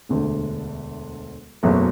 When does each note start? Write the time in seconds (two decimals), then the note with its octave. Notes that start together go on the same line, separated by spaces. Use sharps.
0.09 E1 D2 D3 A3
1.63 F#1 E2 B2 F#3 A3